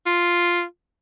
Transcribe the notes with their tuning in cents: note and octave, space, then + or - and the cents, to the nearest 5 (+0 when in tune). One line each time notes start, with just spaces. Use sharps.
F4 +0